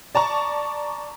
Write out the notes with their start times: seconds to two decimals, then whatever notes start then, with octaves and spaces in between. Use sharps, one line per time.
0.15 D5 A5 A#5 C#6